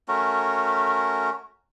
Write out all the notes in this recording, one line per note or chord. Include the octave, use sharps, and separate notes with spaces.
A3 C#4 F#4 A#4